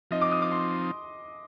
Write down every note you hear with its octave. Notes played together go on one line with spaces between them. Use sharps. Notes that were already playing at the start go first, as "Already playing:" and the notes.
F3 C4 D#4 D#5
D6
D#6
D6
C6